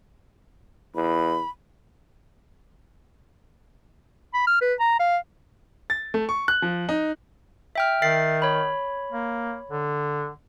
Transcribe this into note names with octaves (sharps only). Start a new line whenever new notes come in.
E2 B5
B5
F6
B4
A#5
F5
A6
A3
C#6
F#6
F3
D#4
E5 G5 F6
D#3 E5 A6 C7
C#5 B5
A#3
D3